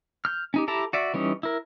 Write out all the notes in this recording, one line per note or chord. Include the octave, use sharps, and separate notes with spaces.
F6 G6
C#4 D#4 G4
E4 G4 A4 A5 A#5
F#4 D5 E5
E3 G3 C#4 D#4
E4 A#4